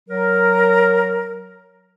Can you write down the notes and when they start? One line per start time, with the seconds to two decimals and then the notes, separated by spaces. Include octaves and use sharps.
0.09 F#3 A#4